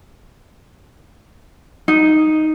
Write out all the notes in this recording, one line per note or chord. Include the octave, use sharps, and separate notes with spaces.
D#4